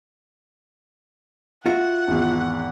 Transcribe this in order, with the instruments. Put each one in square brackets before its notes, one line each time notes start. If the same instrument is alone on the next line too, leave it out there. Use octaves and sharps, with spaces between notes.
[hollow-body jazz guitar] F4 F#4 E5 [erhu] F#5
[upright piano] G#1 E2